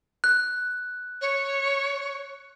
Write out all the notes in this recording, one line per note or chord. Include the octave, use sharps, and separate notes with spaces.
F#6
C#5